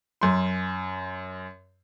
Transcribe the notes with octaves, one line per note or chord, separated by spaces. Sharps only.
F#2 C6